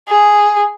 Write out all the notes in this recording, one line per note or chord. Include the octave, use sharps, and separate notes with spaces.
G#4